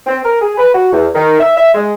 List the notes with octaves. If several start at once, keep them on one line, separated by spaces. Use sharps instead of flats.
C4
A#4
G#4
B4
F#4
E2
D#3
E5
E5
G#3